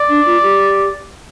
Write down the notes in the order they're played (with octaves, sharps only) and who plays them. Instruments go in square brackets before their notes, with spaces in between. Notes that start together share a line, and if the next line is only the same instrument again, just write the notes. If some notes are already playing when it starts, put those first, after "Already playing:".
Already playing: [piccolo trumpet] D5
[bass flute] D4
F4
G4